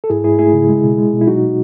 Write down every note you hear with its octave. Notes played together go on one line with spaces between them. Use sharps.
A4
G#2 E4 G#4
G#2 E4 G#4
A3 E4 G#4
C#3
G#3
B2
G#3
B2
E4
F#3 D#4 F#4